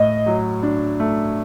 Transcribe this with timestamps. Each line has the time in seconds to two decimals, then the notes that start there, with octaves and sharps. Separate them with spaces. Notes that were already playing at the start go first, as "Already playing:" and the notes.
Already playing: A2 D#5
0.26 F#3
0.63 D4
1.00 A3